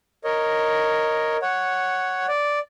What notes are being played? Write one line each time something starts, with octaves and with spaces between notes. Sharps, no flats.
A#4 C#5 D#5
C#5 F#5
D5